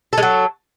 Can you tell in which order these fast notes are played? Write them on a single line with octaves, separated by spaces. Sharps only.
A4 G#3 F#3